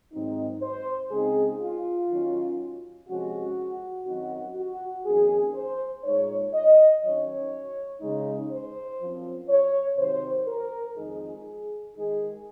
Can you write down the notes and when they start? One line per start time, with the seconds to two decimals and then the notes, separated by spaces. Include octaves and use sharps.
0.13 G#2 D#3 F#3 C4 D#4
0.62 C5
1.11 C#3 G#3 C4 D#4 G#4
1.60 F4
2.09 D#3 F#3 C#4
3.08 C3 F3 G#3 C#4 F#4
4.06 F#2 D#3 F#3 C4 D#4 F#4
4.56 F#4
5.05 F2 D#3 A#3 C#4 G#4
5.55 C5
6.04 A#2 G#3 D#4 C#5
6.53 D#5
7.02 D#3 F#3 C#4 C#5
8.01 C#3 G#3 D#4
8.50 C5
9.00 F#2 F3 C4
9.49 C#5
9.98 C3 D#3 F#3 C5
10.47 A#4
10.96 F2 D#3 G#3 D#4 G#4
11.95 D#3 G#3 D#4 G#4